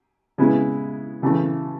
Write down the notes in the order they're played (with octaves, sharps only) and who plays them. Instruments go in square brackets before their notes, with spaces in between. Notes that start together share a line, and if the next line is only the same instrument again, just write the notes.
[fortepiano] C#3 G#3 B3 E4
C#3 E3 A3